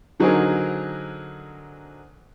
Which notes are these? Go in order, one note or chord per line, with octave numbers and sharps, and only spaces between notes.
D3 F#3 C4 D#4 G#4 A#4